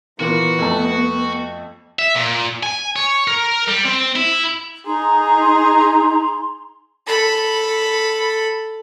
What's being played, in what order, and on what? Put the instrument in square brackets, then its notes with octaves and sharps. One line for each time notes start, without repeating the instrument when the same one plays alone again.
[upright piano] A#2 E3 A#3 [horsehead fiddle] B3 [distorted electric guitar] F#4
[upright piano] F2 A3 A5
[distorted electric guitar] E5
A#2
G#5
C#5
A#4
G3
C4
E4
[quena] D#4 [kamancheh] G#4 [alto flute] A#5 [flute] C6
[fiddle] A4 B5